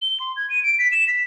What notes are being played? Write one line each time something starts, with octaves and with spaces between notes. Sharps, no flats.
G7
C6
G#6
D#7
D7
B6
E7
B6